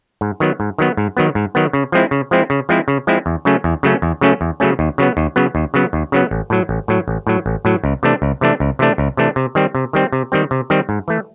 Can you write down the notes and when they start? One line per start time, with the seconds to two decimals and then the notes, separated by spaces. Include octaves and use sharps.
0.21 G#2
0.40 D#3 F#3 B3
0.60 G#2
0.78 D#3 F#3 B3
0.97 G#2
1.17 D#3 F#3 B3
1.35 G#2
1.55 D#3 F#3 B3
1.73 C#3
1.92 F3 G#3 C4 E4
2.11 C#3
2.31 F3 G#3 C4 E4
2.50 C#3
2.69 F3 G#3 C4 E4
2.88 C#3
3.07 F3 G#3 C4 E4
3.26 E2
3.45 C#3 F#3 A3 C#4
3.64 E2
3.83 C#3 F#3 A3 C#4
4.02 E2
4.21 C#3 F#3 A3 C#4
4.41 E2
4.60 C#3 F#3 A3 C#4
4.79 D#2
4.98 C#3 F#3 B3
5.17 D#2
5.36 C#3 F#3 B3
5.55 D#2
5.74 C#3 F#3 B3
5.93 D#2
6.12 C#3 F#3 B3
6.31 A1
6.50 A2 F#3
6.69 A1
6.88 A2 F#3
7.08 A1
7.27 A2 F#3
7.46 A1
7.65 A2 F#3
7.84 C#2
8.03 C3 E3 A3 D4
8.22 C#2
8.41 C3 E3 A3 D4
8.60 C#2
8.79 C3 E3 A3 D4
8.98 C#2
9.17 C3 E3 A3 D4
9.36 C3
9.55 D#3 G3 C4
9.75 C3
9.93 D#3 G3 C4
10.13 C3
10.32 D#3 G3 C4
10.51 C3
10.70 D#3 G3 C4
10.89 G#2
11.08 E3 A3